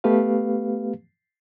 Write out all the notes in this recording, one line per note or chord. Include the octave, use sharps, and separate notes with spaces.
A3 B3 G4 B4 F5